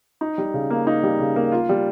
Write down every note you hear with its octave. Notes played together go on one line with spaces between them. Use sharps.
D#4
G3
C#3
A#3
D#4
G3
C#3
A#3
F4
G3